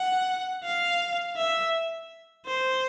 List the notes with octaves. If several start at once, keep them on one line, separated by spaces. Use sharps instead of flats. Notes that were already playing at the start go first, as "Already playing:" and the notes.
Already playing: F#5
F5
E5
C5